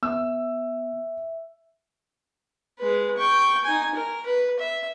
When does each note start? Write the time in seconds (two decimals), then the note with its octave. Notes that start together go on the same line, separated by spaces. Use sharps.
0.03 B3 E5 E6
2.79 G#3 B4
3.18 G5 C#6
3.64 D#4 G#5
3.95 A#4
4.26 B4
4.60 E5